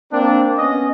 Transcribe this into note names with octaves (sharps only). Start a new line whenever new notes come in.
A#3 C4 D4
B3 C#4 D#5